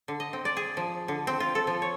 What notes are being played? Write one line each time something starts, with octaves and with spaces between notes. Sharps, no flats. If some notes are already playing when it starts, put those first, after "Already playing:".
D3
D#5
C4
D5
G#4
F3
D3
C4
F4
A4
F3
C#5